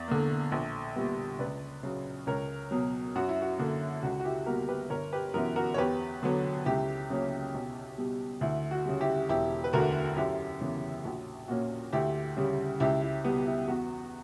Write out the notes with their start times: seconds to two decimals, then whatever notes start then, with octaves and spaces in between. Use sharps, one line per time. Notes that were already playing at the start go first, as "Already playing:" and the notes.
Already playing: E2 D5
0.08 D3 A#3
0.52 A#1
0.96 A#2 G3 B3
1.39 C#2 B4 D5
1.83 C#3 F#3
2.27 C#2 A#4 C#5
2.71 B2 F#3
3.15 F#2 F#4
3.29 E4
3.42 F#4
3.58 D3 A#3
4.03 C#2 F#4
4.20 F#4
4.25 E4 G4
4.46 B2 G3 A#3 F#4 A#4
4.68 G4 B4
4.90 G1 A#4 C#5
5.13 G4 B4
5.34 F#2 E3 B3 F#4 A#4
5.56 F#4 A#4
5.74 C#5
5.78 E2 G4 B4
6.23 D3 F#3 B3
6.65 C#2 E4 G4
7.10 C#3 F#3 A#3 C#4
7.54 B1
7.98 B2 G3
8.41 D2 E4
8.71 F#4
8.85 C#3 G3
9.01 E4 G4
9.29 E1 E4 G4
9.64 B4
9.73 D2 D3 F#4 A#4
10.16 F#2 E4 G4
10.61 C#3 E3 G3 B3
11.04 A#1 F#4
11.48 A#2 A#3 C#4 F#4
11.93 D2 E4 G4
12.37 C#3 G3
12.80 C#2 E4 G4
13.02 E4
13.24 B2 G3 B3
13.46 E4
13.68 E2 F#4